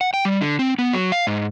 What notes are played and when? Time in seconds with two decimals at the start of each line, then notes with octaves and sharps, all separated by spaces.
0.01 F#5
0.14 G5
0.25 G3
0.41 D3
0.59 C4
0.79 B3
0.93 F#3
1.12 F5
1.27 G#2